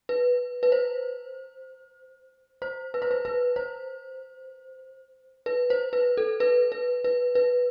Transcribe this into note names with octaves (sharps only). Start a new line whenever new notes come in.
B4
B4
C5
C5
B4
C5
B4
B4
C5
B4
C5
B4
A4
B4
B4
B4
B4